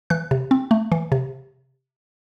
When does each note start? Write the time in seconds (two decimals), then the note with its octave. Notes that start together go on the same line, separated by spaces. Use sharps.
0.10 E3 F#6
0.31 C3
0.51 C4
0.71 A3
0.92 E3
1.12 C3